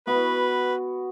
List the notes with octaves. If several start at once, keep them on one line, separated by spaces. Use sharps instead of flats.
B3 F#4 B4